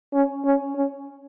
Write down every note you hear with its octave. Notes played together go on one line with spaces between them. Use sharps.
C#4
C#4
C#4